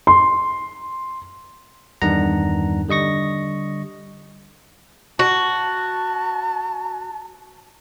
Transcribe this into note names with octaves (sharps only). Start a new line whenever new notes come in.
C6
E2 G2 D#3 D4 F#5 A#5
D3 G3 D#5 C#6 A#6
F#4 A5